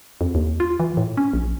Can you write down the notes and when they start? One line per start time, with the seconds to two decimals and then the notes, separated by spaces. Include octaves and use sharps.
0.21 F2
0.35 D#2
0.60 F4
0.80 E3
0.97 A2
1.17 C#4
1.33 A#1